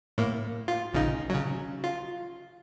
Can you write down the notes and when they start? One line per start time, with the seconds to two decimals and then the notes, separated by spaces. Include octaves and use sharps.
0.18 A2 A#3
0.68 F4
0.94 A#1 C#3 D#4
1.30 C#3 F#3
1.84 F4